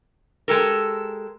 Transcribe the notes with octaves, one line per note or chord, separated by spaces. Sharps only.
G#3 G4 A4 A#4